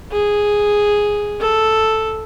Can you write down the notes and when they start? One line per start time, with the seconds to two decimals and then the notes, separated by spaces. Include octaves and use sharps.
0.12 G#4
1.40 A4